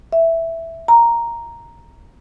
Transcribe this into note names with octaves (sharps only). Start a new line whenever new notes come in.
E5
A#5